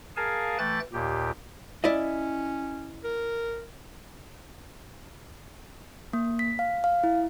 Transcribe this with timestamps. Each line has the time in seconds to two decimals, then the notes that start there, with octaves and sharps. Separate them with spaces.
0.16 G#4 A#4 F5 G#5 A5
0.58 E3 A3 G5 F#6 A6
0.93 D#2 A#2 G4
1.84 C#4 E4 D5 D#5
3.04 A#4
6.13 A#3
6.39 B6
6.59 F5
6.84 F5
7.04 E4